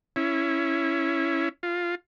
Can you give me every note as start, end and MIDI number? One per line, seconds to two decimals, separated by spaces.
0.16 1.49 61
0.16 1.49 64
1.63 1.95 65